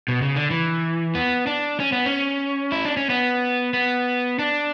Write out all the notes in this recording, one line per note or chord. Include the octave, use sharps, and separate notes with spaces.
B2
C#3
D3
E3
B3
D4
C#4
B3
C#4
E4
D4
C#4
B3
B3
D4